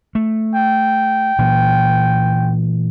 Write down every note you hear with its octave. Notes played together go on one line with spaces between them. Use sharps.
A3
G5
A#2 E3